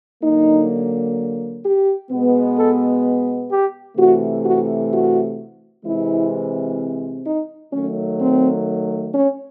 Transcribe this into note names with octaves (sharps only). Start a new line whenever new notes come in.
D3 F#3 A#3 D#4
G4
B2 G#3 B3
A4
G4
C3 E3 A3 F#4
F#4
F#4
C3 E3 G#3 C4 E4
D#4
D#3 F#3 A3 C#4
C4
C#4